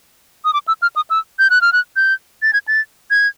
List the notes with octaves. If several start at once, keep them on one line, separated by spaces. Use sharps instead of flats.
D#6
D6
E6
F6
D#6
E6
G6
F#6
F6
F#6
G6
A6
G#6
A6
G#6